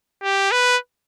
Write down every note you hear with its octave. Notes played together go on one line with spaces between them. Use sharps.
G4
B4